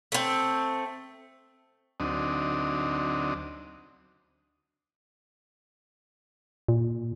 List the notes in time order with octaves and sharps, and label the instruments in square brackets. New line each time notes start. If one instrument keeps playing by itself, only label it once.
[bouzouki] A3 C4
[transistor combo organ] D2 F#3 C4 D4 D#4 D#6
[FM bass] A#2